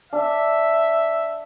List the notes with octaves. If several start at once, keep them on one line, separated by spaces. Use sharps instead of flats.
D4 E5